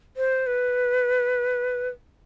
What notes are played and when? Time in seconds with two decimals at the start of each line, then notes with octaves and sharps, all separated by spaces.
0.17 C5
0.47 B4